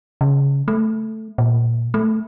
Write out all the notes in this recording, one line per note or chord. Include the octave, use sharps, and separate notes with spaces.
C#3
A3
A#2
A3